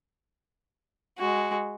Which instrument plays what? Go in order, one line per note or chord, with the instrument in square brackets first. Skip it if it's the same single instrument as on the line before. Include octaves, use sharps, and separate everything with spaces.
[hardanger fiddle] G#3 F#4